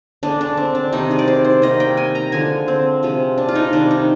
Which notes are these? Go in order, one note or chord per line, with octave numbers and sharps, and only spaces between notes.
D3 G#3 D4
D4
C4
D4
C3 D#3 G3 D#4
G#4
D5
C5
C5
C3 D#3 G3 A#3 D#5
G5
G#5
A#5
D3 F3 G#3 G#5
C4
C3 F3 G#3
D4
F4
D#4
C3 D#3 G3 D4
D#4